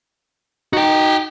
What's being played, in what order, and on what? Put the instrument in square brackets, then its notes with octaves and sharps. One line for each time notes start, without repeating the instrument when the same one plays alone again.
[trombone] D#4 [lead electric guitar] F#4 G5